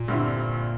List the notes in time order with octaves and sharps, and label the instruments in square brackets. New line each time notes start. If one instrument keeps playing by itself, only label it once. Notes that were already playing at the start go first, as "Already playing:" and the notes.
Already playing: [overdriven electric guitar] A#2
[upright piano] G2 D3 G3 C4 E4